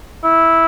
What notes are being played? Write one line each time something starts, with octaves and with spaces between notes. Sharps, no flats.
E4